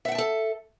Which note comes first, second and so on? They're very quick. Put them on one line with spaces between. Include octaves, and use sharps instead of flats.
E5 F#5 G5 A5 A4